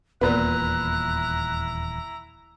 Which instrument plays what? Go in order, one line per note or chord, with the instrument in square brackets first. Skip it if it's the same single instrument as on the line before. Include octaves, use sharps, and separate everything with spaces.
[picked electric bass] D#1 E2 [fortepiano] A#2 B3 [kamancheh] E4 A#5 [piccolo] F#6